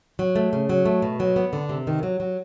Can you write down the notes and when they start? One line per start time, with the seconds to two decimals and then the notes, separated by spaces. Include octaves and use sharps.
0.19 F#3
0.35 A3
0.53 C#3
0.69 F#3
0.85 A3
1.02 B2
1.20 F#3
1.36 B3
1.53 D3
1.69 C3
1.87 D#3
2.03 F#3
2.20 F#3